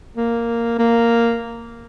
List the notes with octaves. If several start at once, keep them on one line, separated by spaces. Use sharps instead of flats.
A#3
A#3